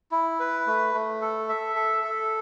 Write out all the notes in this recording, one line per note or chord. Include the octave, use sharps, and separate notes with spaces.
E4
B4
A3
A3
A4
E5
A4
A4